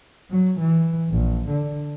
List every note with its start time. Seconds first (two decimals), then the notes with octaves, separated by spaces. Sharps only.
0.30 F#3
0.60 E3
1.10 A#1
1.49 D3